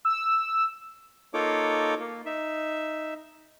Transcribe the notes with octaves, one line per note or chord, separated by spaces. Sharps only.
E6
A#3 D#4 F4 A4 C#5 D6
A#3
D#4 E5